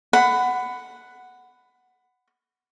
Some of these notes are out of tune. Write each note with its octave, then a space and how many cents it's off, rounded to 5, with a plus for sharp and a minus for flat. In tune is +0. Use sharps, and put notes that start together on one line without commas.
F#5 +0 B5 +20